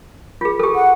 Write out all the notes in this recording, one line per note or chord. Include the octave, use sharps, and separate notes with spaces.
F4 G#4
G4 A4
F#5